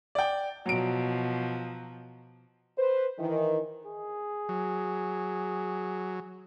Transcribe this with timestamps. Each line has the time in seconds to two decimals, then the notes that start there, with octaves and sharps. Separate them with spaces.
0.15 D5 G5
0.66 B2 F3 F#3 D7
2.78 B4 C5
3.19 D#3 E3
3.86 G#4
4.49 F#3